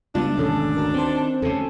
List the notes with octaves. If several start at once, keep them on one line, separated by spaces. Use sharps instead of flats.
C#2 G3 B3 D4 E4 F4
G#1 D2 B2 C#4 A4
F#4 A#4
D#3 C4 C5
D2 C3 C#4 A4